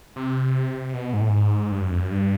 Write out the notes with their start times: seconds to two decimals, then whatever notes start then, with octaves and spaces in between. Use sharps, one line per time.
0.16 C3
0.94 B2
1.14 G#2
1.21 A2
1.29 G#2
1.72 G2
1.82 F#2
1.91 F2
2.01 F#2
2.11 G2